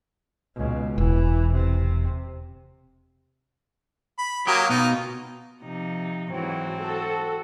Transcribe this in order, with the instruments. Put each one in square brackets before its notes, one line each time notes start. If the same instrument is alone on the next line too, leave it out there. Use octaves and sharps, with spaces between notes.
[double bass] C#2 B2
[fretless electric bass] E1 [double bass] E3
[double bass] C3
[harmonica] B5
[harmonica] F#3 A#3 D#6 [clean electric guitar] G4
[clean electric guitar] B2 [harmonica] D#4 F4
[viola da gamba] C3 F3 D#4
[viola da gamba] G#2 E3 F#3 [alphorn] C4
[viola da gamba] F#4 [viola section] A4